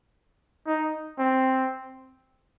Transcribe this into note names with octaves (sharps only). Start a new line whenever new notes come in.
D#4
C4